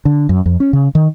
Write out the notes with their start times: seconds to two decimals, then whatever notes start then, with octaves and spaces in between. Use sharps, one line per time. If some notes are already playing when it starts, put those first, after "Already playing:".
0.05 D3
0.29 F#2
0.46 F2
0.60 C#4
0.73 C#3
0.95 D#3